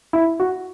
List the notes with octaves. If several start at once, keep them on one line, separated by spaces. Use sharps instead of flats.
E4
F#4